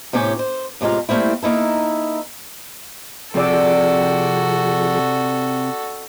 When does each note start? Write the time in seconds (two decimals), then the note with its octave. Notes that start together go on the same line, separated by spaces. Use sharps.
0.13 A2 C3 C#4 G4
0.39 C5
0.81 A2 C3 G#3 F4 A#5
1.09 G3 A3 A#3 C4 E4
1.42 A#3 D#4 E4 A4
3.35 C3 F3 C4 F#4 G#4 A4 D5 E6